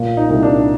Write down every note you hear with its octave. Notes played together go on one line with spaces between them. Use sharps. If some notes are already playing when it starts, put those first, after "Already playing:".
Already playing: A#2
D#4
C2
D4